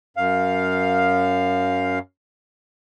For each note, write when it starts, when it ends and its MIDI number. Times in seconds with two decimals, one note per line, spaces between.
0.17 1.99 42
0.17 1.99 77